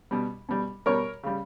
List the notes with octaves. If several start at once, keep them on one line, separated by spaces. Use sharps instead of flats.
B2 G3
B2 G3
B2 G3 A#4 C#5
C#3 G3